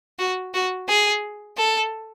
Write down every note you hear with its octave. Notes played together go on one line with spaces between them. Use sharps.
F#4
F#4
G#4
A4